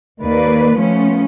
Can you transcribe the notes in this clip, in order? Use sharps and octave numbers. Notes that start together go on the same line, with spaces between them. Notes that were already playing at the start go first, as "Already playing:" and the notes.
D#2 A#3 B4 D5
F3 A3 B3 C#4